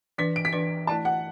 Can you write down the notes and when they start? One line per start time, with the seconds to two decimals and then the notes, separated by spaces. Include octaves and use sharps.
0.18 E3 D4 B4 B6
0.36 D7
0.45 B6
0.53 E3 D4 B4
0.87 A3 E4 D5 A5
1.05 F#5